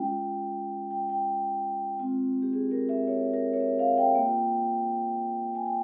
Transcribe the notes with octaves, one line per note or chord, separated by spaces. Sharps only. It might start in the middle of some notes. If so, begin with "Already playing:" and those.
Already playing: G#3 C#4 F4 G5
G5
G5
G#3 C4 F4
G4
G#4
A#4
E5
C#5
A#4
C#5
E5
F5
G5
A#3 F4 G5
G#5
G5